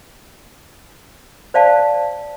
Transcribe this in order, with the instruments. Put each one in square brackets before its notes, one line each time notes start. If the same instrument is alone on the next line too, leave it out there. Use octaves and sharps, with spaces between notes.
[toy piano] C5 D5 F5 A5